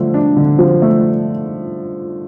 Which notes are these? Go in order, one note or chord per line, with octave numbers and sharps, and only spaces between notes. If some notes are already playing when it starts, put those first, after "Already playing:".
Already playing: D3 F3 A3
D4
D3
F3
A3